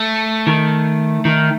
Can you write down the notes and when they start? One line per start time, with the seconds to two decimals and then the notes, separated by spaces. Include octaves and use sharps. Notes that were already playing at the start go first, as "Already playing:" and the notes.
Already playing: A3
0.47 D#3
1.25 D#3